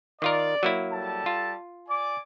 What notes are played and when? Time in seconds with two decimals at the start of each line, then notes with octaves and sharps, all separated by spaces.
0.22 D#3 F4 A#4 D5
0.63 F#3 A#3 E4
0.93 G3 A4 A5
1.26 F4
1.89 D5 G#5 D6